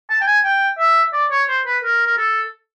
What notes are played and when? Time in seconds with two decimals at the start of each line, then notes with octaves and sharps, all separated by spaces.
0.10 A5
0.21 G5
0.27 G#5
0.44 G5
0.78 E5
1.13 D5
1.31 C#5
1.48 C5
1.66 B4
1.83 A#4
2.06 A#4
2.17 A4